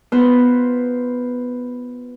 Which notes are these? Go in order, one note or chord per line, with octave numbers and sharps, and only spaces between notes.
B3 F4 B4 C5 A#5